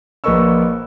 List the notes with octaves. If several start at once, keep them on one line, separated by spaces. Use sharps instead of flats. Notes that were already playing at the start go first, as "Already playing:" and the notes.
A#1 A#3 B4 D#5 C#6 E6